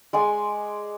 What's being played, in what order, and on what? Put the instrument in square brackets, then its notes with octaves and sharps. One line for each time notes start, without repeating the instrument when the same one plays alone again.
[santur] G#3 D5 G#5 C6